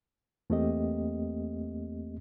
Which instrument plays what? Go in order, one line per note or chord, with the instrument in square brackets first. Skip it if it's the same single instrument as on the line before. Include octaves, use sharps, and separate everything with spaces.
[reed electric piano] E2 A3 A#3 C4 G4 D#5